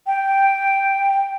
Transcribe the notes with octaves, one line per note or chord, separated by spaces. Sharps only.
G5